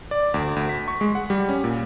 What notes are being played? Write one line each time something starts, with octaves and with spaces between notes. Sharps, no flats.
D5
D2
D2
B6
C#6
G#3
F#5
G3
C#4
A#2